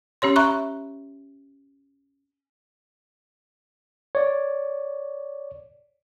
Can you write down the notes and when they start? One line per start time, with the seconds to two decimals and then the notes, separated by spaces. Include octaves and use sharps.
0.22 C#4 G4 C#5 C6
0.36 E5 A#5 B5 C#6 F#6
4.15 C#5 D5